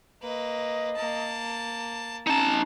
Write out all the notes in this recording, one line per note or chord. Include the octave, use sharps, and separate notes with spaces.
A#3 B4 D#5
A#3 A5
C#4 D#4 A5 A#5